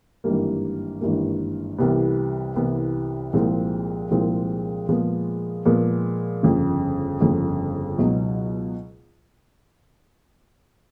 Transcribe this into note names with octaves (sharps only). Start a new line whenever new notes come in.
G#1 G2 E3 G3 A#3
G#1 G2 E3 G3 A#3
C2 C3 E3 G3 B3
C2 C3 E3 G3 B3
C2 A#2 F3 G#3 C4
C2 A#2 F3 G#3 C4
A#2 F3 G#3 B3
A#2 F3 G#3 B3
G1 F2 C#3
G1 F2 C#3
C#2 B2 F#3 B3 D#4